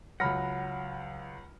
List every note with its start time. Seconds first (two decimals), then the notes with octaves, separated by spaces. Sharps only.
0.20 C#2 F#3 F#5 B5 F6 A#6